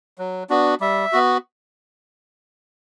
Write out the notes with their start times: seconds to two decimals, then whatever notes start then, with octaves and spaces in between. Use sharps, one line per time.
0.18 F#3
0.50 B3 D4 F#4
0.80 G3 E5
1.13 B3 F#4